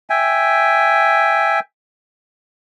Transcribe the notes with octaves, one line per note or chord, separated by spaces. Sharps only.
E5 G5 G#5